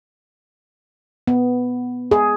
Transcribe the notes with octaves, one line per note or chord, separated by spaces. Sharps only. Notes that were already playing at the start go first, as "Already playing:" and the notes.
B3
G#4